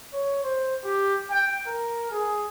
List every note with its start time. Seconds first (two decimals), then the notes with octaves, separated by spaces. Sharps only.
0.13 C#5
0.43 C5
0.84 G4
1.31 G5
1.67 A#4
2.11 G#4